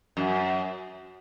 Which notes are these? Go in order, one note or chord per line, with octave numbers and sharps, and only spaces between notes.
F#2